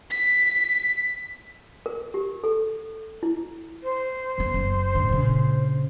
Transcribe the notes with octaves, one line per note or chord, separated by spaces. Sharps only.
B6
A#4
G4
A4
E4
C5
C#3 B3
F#1
A2 D3
A#1 C#3